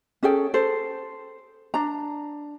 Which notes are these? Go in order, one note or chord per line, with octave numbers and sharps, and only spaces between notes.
C#4 G#4 A4 G5
A4 C5
D4 A#5